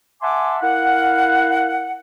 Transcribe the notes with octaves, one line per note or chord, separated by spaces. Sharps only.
E5 F#5 G#5 A5 C6 D6
E4 A#4 F5 F#5